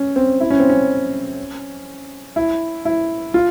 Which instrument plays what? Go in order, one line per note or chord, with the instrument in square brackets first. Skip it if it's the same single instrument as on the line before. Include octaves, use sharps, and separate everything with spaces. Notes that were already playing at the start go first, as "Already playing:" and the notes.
Already playing: [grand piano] C#4
C4
E4
C#4
C4
C#4
E4
E4
F4